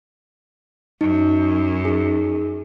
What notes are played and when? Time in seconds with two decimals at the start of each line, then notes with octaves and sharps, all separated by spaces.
1.01 F#2 D#4
1.85 D#4 G#4